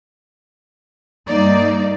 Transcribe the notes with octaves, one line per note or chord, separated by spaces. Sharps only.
G2 A#3 D#4 D5